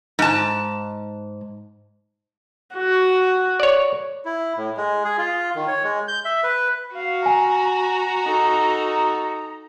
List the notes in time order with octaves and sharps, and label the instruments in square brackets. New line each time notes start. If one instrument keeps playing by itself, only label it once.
[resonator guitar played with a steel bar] G#2 A5
[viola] F#4
[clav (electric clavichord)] C#5 D5
[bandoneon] E4
A2
G#3
G#4
F4
D#3
C#5
G#3
G6
E5
B4
[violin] F#4 [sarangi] F5
[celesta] G#5 [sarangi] A#5
[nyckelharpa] D#4 A4